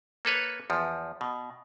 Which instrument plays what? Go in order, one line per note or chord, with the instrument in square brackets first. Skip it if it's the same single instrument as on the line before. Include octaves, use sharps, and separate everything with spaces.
[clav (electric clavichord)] A#3 A4 B4 C#5
E2 F3
B2